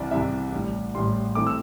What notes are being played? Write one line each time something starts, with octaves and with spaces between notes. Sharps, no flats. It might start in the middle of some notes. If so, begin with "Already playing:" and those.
Already playing: C2 C3 E3 D5 E5
C2 C3 E3 E5
A1 A2 G3
A1 A2 G3 C6
E3 A3 C4 D6
E6